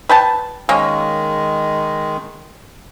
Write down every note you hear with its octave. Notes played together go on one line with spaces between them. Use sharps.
B4 G5 A5
D#3 G#3 A#3 C#4